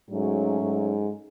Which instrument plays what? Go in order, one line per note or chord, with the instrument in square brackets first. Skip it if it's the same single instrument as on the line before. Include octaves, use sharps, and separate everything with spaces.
[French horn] G#2 [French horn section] F#3 A3 C#4
[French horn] G#2